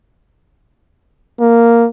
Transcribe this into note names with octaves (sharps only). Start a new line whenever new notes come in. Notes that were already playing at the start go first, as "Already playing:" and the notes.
A#3